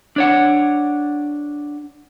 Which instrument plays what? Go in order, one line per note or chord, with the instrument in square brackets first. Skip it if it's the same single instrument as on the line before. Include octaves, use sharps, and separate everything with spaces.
[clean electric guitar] D4 C#5 F#5